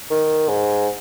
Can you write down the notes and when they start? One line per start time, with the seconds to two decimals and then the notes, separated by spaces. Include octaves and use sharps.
0.11 D#3
0.49 G#2